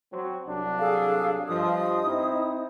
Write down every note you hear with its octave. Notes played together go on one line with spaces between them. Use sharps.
F#3 C4
C2 F#3 D4
G#4 A4 F5
G2 F3 D#5 D#6
C4 D#4 E4